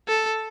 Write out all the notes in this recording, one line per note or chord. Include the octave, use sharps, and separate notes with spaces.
A4